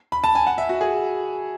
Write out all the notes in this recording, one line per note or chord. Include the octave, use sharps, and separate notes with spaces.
B5
A5
G#5
F#5
E5
F#4
G#4